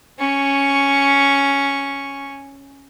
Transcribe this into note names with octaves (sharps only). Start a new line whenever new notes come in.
C#4 C#6